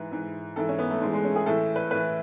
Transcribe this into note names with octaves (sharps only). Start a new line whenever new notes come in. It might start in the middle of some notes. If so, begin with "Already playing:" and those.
Already playing: G#2 E3 B4
G#2 E3
G#2 E3 A4
C#4
B3
A3
G#2 E3 G#3
G#3
C#4
G#4
A2 E3 A4
B4
A2 E3 B4